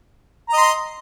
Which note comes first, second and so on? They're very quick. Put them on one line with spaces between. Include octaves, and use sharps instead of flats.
A#5 D#5 C6